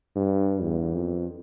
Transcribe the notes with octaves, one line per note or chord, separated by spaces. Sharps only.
G2
E2
F2